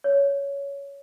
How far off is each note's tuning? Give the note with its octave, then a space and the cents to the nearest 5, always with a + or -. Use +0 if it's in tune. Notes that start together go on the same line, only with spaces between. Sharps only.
C#5 +15